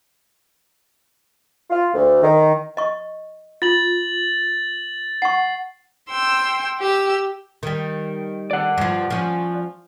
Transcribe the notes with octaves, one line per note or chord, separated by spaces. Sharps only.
F4
D2
D#3
D#5 C#6
F4 A6 F#7
F#5 C#6 C7
G5 C6 E6
G4 E6
D#3 G3
D5 F#5
G2 F3
F3 C#4